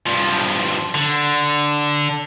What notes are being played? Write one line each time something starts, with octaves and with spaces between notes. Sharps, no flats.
G2 F3
D3